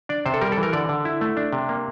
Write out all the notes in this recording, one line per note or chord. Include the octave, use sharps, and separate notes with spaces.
D4 D5
C3 C5
A4
G3 A#4
A4
E3
A#4
D3 D5
D3
E4
A3
D4
C3
A#3